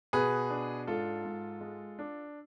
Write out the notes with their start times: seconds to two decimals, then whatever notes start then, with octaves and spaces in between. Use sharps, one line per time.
0.13 B2 G#4 B4
0.50 D4
0.87 G#2 F4 A4
1.25 G#2
1.61 G#3
1.99 D4